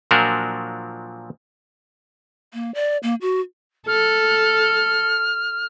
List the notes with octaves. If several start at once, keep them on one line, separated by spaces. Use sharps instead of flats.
A#2 F3 F#3 D4 F#4 A#4
A#3
D5
A#3
F#4
A4 F6